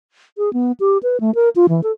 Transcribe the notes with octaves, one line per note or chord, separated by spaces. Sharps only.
G#4
B3
G4
B4
A3
A#4
F4
E3
A4